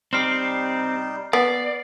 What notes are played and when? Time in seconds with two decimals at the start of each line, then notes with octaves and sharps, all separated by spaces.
0.13 G3 C4 D#4 G4 C6 F6 C7
1.33 B3 D5 C7